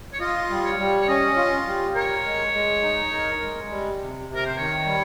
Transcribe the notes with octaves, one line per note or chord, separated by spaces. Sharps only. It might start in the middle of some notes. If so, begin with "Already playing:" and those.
C#5
F4 D#5
G3
C#5
G3
C#5
C#4 D#5
F4
G3
A#4 C#5
G#3
G#3
D#4
A#4
G#3
G3
C3
C3
A#4
C5
D#3 C#5
G3